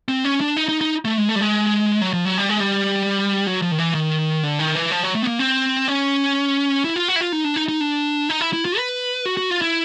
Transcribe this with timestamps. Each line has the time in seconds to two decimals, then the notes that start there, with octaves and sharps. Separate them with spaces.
0.08 C4
0.25 C#4
0.41 D4
0.57 D#4
0.69 D#4
0.81 D#4
1.05 A3
1.18 G#3
1.29 A3
1.36 G3
1.41 G#3
2.01 F#3
2.13 F3
2.25 F#3
2.38 G3
2.49 G#3
2.60 G3
3.47 F#3
3.62 F3
3.72 D#3
3.78 E3
3.95 D#3
4.43 D3
4.59 D#3
4.75 E3
4.91 F3
5.03 F#3
5.15 A3
5.22 B3
5.27 A#3
5.39 C4
5.88 C#4
6.84 E4
6.96 F4
7.08 F#4
7.16 E4
7.21 F4
7.32 D#4
7.44 D4
7.56 D#4
7.68 D#4
7.81 D4
8.29 D#4
8.41 E4
8.53 E4
8.65 F4
8.78 B4
9.25 F#4
9.37 F#4
9.50 F4
9.62 E4